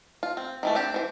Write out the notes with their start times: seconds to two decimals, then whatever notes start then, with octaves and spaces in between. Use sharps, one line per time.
0.23 F4
0.37 C4
0.63 D#3 E3 A3
0.75 C4 D4 G4
0.94 E3 C5